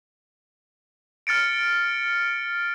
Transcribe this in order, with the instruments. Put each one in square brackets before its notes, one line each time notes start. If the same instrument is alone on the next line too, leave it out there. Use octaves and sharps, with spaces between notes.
[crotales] F6 A6 C#7 D7